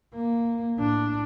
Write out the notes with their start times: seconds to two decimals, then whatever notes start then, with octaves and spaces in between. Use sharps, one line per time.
0.14 A#3
0.77 A2 D4